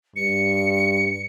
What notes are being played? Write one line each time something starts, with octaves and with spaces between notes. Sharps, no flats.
G2 C#7